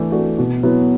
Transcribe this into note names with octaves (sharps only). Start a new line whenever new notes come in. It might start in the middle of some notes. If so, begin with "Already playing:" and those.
Already playing: E3 A3 D4
A3 D4 F#4
B2
F#3 B3 E4